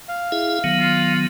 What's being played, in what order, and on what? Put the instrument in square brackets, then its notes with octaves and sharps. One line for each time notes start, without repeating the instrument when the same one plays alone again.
[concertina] F5
[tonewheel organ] E4 G#4 E5
D#3 F#3 B3
[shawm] F4